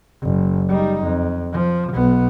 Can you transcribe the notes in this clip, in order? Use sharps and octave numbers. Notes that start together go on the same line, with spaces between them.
F#1
G3 D#4
F2
F3
B1 B3